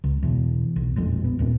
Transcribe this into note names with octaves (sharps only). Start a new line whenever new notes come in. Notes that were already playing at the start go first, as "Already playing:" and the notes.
C#2
E2 B2
B1
E1 A#1 F2
B3
D#2 A#2